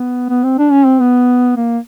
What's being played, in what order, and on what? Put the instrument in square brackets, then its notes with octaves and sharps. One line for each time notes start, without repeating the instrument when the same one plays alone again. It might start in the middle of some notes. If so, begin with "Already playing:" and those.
Already playing: [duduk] B3
B3
C4
D4
C#4
C4
B3
A#3